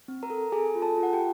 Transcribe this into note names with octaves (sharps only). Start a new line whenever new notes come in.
C4
A#4 A#5
A4
G#4 A4 G#5
F4
A4 A5
F4
F#5
G4 G5